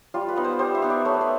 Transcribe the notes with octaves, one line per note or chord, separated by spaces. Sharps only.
G3 F4
B4
B3 D#4
C5
G3 C5
E5
B3 D#4
D5
A3 C#5
B4
C5